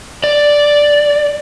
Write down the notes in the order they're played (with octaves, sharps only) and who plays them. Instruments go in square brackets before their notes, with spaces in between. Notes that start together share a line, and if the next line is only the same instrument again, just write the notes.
[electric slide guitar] D5